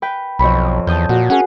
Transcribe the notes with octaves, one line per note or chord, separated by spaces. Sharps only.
B4 G5
B1 F2 C#5 B5
E2 A5 D#6 G6
A#2 F#4
C#4 G#4 A#4 F#5